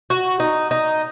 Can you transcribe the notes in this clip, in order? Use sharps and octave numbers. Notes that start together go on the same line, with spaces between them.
F#4
D#4
D#4